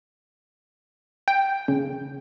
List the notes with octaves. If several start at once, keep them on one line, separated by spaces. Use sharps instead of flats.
G5
C#3